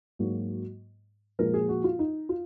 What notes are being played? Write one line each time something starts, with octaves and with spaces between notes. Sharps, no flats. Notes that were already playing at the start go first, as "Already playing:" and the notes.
G#2 F#3 A#3
A#2 F3 G#3 A#4
G#4
F#4
F4
D#4
F4